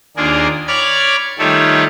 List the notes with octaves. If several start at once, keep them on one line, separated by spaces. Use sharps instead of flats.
D#2 A#3 D4 F4 G#4 A#4
C#5 D5 B5 D6 F6 G#6
D#3 G3 A3 F4 A4 C#5